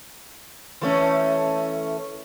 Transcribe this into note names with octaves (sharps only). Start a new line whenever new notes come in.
E3 A3 C#4